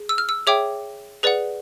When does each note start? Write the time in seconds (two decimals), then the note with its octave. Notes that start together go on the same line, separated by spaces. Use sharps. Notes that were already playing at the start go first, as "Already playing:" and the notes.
Already playing: G#4
0.09 E6
0.18 F6
0.29 E6
0.47 G#4 C#5 E5 G5 D6
1.23 G#4 B4 D5 F#5